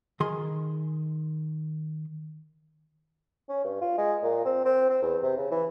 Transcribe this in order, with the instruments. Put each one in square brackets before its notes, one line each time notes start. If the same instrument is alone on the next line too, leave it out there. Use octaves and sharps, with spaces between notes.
[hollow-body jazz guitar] D#3 G#4 C6
[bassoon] C#4
G2
F4
G#3
A#2
C4
C4
C4
E2
C3
C#3
E3